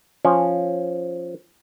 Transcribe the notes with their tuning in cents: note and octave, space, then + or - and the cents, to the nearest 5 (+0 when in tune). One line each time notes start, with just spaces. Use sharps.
F3 +0 C#4 -5